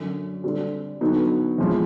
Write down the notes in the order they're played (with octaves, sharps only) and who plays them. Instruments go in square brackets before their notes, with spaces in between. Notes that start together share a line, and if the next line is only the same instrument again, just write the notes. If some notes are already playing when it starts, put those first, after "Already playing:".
Already playing: [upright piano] F#2 D3 F#3
D3 G3 C4
D3 F#3 B3 D#4
E2 C3 F3 G#3